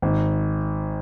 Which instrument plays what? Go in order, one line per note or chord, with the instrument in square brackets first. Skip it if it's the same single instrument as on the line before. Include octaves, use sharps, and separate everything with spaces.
[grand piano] G#1